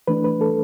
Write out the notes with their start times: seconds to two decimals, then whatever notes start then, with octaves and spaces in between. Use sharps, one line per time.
0.08 E3 A3 D4 B4
0.24 B4
0.41 A4